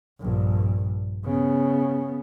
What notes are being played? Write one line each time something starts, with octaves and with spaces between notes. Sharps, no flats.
A#1 G2
C#3 B3